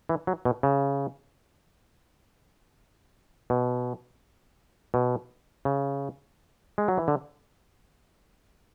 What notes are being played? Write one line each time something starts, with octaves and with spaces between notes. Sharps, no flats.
E3
F#3
B2
C#3
B2
B2
C#3
G#3
F#3
E3
D3